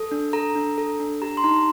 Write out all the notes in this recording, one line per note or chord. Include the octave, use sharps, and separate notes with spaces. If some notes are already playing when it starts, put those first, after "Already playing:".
Already playing: A4
D4
A4 A#5
D4
A4
D4
G4 A#5
C6
D#4 A#5